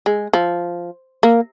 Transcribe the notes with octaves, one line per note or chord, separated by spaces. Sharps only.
G#3
F3
A#3